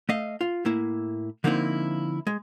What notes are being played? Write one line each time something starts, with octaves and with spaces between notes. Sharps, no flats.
A3 D#5 F5
F4
A2 A#3 E4
D3 F3 A#3 C4 D#4 E4
G#3